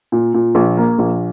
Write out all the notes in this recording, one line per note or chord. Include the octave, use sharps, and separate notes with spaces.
A#2
A#2
A#1
A#3
A#1